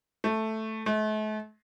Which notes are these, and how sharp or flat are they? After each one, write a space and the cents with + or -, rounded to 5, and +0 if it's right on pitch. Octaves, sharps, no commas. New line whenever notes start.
A3 +0
A3 -40